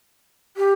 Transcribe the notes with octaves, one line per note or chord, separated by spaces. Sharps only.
G4